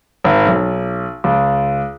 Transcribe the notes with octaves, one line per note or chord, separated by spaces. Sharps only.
G#1
B1
C#2